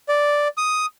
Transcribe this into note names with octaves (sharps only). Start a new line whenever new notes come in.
D5
D#6